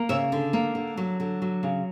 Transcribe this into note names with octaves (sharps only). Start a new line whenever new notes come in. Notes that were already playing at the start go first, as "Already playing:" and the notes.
Already playing: A#3
C#3 C#5 E5
D3
A#3
D3
F#3
D3
F#3
C#3